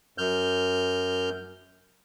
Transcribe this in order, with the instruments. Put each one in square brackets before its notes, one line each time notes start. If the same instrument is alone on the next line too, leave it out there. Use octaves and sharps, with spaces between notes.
[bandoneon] F#2 F6 G6